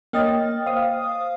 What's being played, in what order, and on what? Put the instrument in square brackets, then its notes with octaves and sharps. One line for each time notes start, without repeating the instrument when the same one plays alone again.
[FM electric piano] A#3 D#5 A6 [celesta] C#5 G5 F6
[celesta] C5 [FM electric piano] F5 D#6